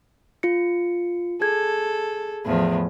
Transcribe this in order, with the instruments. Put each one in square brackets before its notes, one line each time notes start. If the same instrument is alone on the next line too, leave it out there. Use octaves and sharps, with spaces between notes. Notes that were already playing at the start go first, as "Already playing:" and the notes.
[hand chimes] F4 C#7
[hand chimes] G#4 G#6 [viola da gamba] A4
[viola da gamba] E2 A2 F3